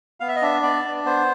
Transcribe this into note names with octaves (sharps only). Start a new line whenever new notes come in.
B3 F5
E5
D#5
D4 E5
B3 D5
D4
B3 C5